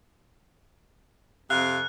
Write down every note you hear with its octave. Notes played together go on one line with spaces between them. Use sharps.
F2 C3 F5 F#6